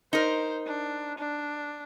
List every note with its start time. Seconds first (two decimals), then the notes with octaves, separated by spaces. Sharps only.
0.13 D#4 A#4 C5
0.66 D4
1.19 D4